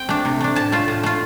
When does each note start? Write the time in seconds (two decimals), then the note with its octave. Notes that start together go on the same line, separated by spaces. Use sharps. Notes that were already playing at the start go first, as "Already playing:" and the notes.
Already playing: C4 G5
0.09 A3 D4
0.25 C3
0.41 A3 D4
0.56 A2 A5
0.72 A3 F4
0.88 A2
1.03 A3 F4